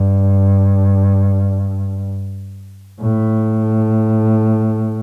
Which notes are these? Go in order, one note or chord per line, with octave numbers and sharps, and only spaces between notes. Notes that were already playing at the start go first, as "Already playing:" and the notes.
Already playing: G2
A2